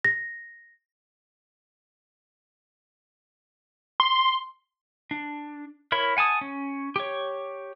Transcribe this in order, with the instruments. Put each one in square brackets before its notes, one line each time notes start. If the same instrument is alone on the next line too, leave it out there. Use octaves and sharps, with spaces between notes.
[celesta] A#6
[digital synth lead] C6
[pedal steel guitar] D4
E4 A#4 C#5 B5
F#5 G#5 A5 D#6
C#4
G4 C#5